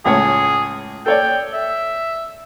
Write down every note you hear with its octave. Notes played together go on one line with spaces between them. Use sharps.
C#2 A2 G#4 C#5
A4 C#5 D5 G5
E5